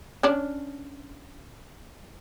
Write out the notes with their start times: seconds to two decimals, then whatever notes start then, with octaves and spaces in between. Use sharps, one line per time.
0.23 C#4 D4